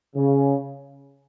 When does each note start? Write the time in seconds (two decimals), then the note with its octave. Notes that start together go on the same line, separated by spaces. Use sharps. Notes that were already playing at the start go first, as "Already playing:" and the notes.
0.15 C#3